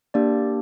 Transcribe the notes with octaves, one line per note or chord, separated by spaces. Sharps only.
A#3 D4 G4 D5